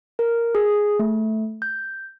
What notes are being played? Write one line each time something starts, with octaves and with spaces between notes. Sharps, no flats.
A#4
G#4
A3
G6